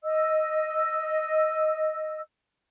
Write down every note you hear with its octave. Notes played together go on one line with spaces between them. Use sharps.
D#5 E6